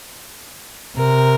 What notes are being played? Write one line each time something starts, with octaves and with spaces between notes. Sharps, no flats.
C3 A#4